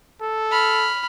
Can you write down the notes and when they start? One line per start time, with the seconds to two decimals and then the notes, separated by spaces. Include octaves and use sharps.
0.21 A4
0.51 B5 F6